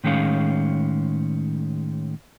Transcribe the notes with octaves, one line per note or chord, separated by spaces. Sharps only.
A2 D#3 G#3 C#4 F5